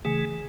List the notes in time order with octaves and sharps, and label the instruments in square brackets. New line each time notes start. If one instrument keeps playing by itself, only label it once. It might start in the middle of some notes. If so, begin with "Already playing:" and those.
[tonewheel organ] C#3 E3 A3 [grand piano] G#4